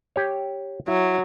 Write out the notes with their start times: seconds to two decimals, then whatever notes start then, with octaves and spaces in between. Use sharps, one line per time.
0.16 G4 C#5
0.88 F#3 E4